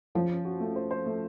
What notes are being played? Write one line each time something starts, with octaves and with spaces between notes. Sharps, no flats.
F3 C#4
C#4
F#4
A3
C5
C5
A3